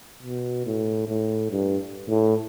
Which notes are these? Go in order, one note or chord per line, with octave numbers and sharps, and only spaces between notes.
B2
A2
A2
G2
A2